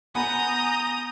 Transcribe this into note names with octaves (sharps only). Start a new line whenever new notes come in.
B3 F#5 G#5 A#5 B5 D#6 G6